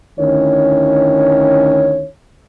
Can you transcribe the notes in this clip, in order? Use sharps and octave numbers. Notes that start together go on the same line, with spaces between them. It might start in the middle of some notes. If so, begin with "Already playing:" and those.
D2 D#3 C#4 E4 C#5